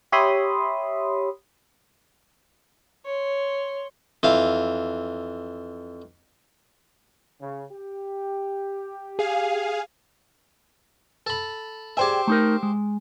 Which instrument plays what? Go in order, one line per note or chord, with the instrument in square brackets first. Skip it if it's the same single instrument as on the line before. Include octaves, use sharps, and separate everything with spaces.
[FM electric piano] G4 C#5 E5 B5 C6 D#6
[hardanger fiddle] C#5 C6
[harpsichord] F2 E3 F5
[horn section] C#3
G4
[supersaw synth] G#4 F5
[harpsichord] A4 B5
[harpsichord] G4 C5 E5 [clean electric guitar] G#4 D5 G5
[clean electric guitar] A3 D#4 A#4
G#3